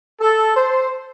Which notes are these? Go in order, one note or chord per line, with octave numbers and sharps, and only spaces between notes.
A4
C5